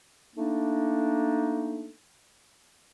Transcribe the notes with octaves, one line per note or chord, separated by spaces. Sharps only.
A3 A#3 D4 D#4